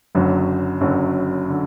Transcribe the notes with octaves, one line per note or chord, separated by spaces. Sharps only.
F#1 F#2 D3 F#3
F#1 F#2 D3 F#3
D3